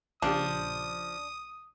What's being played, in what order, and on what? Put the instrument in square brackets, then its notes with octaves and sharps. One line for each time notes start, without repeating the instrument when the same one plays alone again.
[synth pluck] A#1 C#3 G4 [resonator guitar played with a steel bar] F3 [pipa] D4 [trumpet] D#6